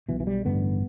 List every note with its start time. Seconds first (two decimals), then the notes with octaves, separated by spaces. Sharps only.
0.09 B1 B2 E3
0.20 E3
0.27 G3
0.45 A1 G2 D3 B3